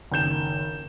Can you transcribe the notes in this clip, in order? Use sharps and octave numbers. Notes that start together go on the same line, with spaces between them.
F#1 D#3 G6 E7